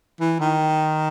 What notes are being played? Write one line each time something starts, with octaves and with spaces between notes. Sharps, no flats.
E3
D#3